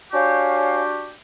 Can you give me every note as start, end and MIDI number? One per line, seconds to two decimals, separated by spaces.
0.12 1.11 62
0.12 1.11 66
0.12 1.11 67
0.12 0.81 73
0.12 0.81 77
0.12 0.81 80